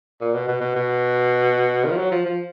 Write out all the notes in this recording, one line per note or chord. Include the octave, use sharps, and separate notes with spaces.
A#2
B2
B2
B2
B2
D#3
F3
F#3
F3
F3